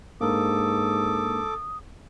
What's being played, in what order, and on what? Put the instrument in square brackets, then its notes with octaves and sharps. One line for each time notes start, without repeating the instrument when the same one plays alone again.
[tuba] G#2 [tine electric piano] A#3 D4 A#4 [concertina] A4 D6 [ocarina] D#6